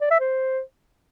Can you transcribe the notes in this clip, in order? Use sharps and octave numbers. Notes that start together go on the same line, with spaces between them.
D5
E5
C5